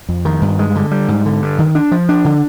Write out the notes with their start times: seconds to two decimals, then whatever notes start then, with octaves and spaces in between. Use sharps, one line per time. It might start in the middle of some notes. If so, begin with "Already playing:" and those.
0.09 F2
0.25 D#3
0.41 G2
0.59 G#3
0.75 D3
0.91 G3
1.08 G#2
1.26 D3
1.42 G2
1.58 D#3
1.75 D4
1.91 F3
2.09 D4
2.25 D3